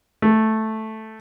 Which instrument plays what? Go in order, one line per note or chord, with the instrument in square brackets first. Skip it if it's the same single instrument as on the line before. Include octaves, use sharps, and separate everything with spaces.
[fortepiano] A3